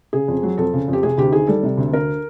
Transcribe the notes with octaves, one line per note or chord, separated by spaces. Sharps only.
C#3 G#4
F2
F#3
F2 A4
C#3
F2 G4
C3 G#4
D2 G4
D#3 G#4
G3 A4
C3
D2
D3 A#4